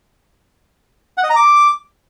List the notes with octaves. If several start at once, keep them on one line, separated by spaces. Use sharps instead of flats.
F#5
D#5
A#5
D6